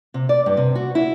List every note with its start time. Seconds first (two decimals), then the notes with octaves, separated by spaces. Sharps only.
0.14 C3
0.29 D5
0.46 G2
0.57 C3
0.75 F#4
0.95 E4